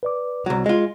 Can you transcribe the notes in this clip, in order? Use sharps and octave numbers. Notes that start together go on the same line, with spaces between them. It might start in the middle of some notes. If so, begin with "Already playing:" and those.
B4 D5 D6
C2 F#3
G#3 F4 D#5